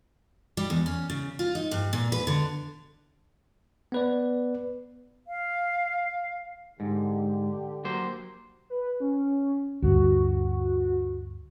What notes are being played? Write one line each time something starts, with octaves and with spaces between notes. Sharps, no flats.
G3
E2
C#4
C#3
F4
D#4
G2
A#2
B4
D3
B3 B4 D5
F5
G#2 D3 G4
F#3 A#3 C5
B4
C#4
D2 G2 F#4